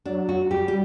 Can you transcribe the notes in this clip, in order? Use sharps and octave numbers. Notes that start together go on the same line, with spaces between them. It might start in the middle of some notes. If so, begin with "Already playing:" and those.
F#3 D4
F#4
G3 G4
G4